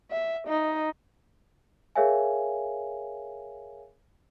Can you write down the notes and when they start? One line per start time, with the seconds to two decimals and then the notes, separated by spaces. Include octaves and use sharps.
0.11 E5
0.47 D#4
1.95 G#4 A#4 C#5 E5 F5 G#5